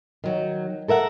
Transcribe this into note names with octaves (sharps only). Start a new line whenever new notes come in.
D#3 F#3
A4 A#4 E5 F#5